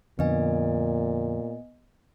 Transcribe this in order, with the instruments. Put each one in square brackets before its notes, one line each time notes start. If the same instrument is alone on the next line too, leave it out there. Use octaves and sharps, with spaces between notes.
[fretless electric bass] F2 D3 [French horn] A#2 [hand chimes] B3 D#5 G#5